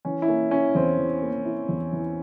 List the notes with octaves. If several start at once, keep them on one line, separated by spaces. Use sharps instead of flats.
E3 C#4
E4
A#3 C#4
C#4 E4
E2 C4
E3
A#3
E4
E2
E3